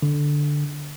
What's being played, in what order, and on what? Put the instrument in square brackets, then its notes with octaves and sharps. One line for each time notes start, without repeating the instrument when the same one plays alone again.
[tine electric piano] D3